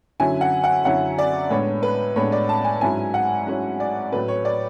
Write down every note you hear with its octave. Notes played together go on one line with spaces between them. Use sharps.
F#2 D3 F#3 C#4 E4 G#5
F#5
F#5
F#2 D3 F#3 C#4 E4 F#5
D5
A2 G#3 B3 D4 C#5
B4
A2 G#3 B3 D4 C#5
D5
A5
G#5
G#2 F#3 C#4 E4 G#5
F#5
G#2 F#3 C#4 E4
D5
A2 F#3 C#4 B4
C#5
D5